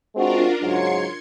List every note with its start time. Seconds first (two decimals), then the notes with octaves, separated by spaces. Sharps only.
0.16 G#3 C4 D4 F4 F#4 A#4
0.63 G#2 C#3 F#3 C6 G#6 C#7